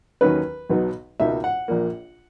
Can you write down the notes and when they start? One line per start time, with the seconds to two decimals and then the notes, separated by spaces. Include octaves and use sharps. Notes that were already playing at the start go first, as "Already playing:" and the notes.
0.21 D#2 D#3 F#3 C#4 B4
0.70 B1 B2 F#3 B3 D#4
1.20 C#2 B2 A#3 D#4 E5
1.44 F#5
1.68 A#1 A#2 A#3